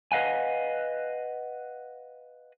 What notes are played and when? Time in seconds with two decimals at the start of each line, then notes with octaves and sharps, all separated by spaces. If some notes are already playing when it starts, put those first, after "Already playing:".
0.12 B4 D#5 F5 F#5 G#5